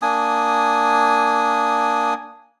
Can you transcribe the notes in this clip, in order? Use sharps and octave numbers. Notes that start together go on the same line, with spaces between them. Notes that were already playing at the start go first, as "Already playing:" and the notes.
A#3 D4 G#5 D#6